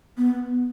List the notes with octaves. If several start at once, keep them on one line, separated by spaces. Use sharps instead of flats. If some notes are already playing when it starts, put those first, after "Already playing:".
B3